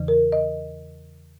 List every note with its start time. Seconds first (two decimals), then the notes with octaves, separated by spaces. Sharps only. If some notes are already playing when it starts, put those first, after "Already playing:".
Already playing: E2 C#3 E3
0.08 A#4
0.32 D#5